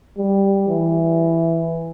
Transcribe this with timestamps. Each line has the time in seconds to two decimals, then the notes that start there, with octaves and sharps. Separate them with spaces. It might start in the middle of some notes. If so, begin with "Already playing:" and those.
0.18 G3
0.68 E3